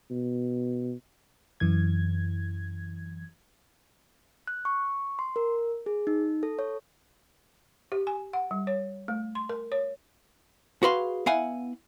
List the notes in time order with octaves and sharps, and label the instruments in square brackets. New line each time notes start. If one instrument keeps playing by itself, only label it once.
[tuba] B2
[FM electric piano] F#2 E3 G#6
[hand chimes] F#6
C#6
C6
A#4
G#4
D#4
A4
C#5
[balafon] G4
G#5
F#5
G3
C#5
A3
C6
A#4
C#5
[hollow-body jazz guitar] F#4 G#4 B4 F5 C6
B3 E4 F5 F#5 G#5